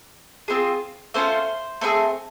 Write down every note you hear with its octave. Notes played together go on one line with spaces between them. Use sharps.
C4 F4 G#4
A3 C#4 F4 C5
A3 C4 E4 G#4